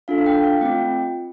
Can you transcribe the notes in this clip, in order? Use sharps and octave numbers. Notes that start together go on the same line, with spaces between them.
D4 F4 A4 F5
F5
G5
F5
A3 C4 F4 G5